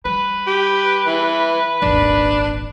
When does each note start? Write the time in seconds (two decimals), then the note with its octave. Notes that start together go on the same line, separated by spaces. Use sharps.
0.05 G3 B4
0.47 G4
1.06 E3
1.82 D#1 G#1 D4